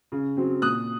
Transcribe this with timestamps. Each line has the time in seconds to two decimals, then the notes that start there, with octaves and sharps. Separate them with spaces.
0.12 C#3
0.37 F#3 C4
0.62 A#2 D#6 F#6